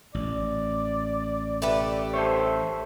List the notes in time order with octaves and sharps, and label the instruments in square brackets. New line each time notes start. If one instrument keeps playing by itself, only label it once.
[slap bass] A1 [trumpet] D5
[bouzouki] A3 G4 B4
[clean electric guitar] A4 C5 C#5 [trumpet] E5